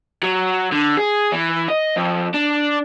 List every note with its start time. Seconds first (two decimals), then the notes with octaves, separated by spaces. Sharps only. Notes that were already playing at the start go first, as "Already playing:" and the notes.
0.23 F#3
0.72 D3
0.97 G#4
1.32 E3
1.68 D#5
1.96 F2
2.34 D4